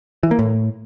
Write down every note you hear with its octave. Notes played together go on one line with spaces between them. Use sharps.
E3
A#3
A2